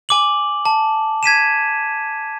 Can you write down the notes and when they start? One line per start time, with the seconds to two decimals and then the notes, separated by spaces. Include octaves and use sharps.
0.09 G#5 D6 F#7
0.66 A5
1.23 G#6 B6 D#7 E7